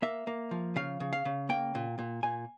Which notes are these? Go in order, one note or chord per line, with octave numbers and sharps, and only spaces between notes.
A#3 E5
A#3
F3
C#3 F5
C#3
F5
C#3
A#3 G5
A#2
A#2
A#2 G#5